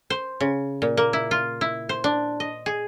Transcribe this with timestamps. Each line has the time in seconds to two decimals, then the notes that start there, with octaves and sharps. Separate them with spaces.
0.10 C5
0.40 C#3
0.82 A#2
0.97 A#3
1.13 E4
1.31 F4
1.61 E4
1.89 C5
2.04 D4
2.40 D#5
2.66 G#4